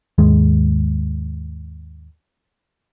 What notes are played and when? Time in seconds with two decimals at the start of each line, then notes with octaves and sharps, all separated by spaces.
0.18 D#2 G#2 G#3